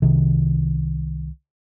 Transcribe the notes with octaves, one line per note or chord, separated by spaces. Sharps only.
C2 C3 D#3